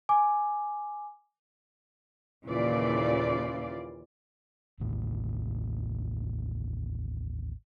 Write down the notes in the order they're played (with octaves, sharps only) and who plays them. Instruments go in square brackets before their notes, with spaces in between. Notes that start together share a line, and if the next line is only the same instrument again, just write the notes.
[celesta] G#5 D6
[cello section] D#2 A#2 C#3 E3 F4 D5
[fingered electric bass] A1 D#2 A2 D3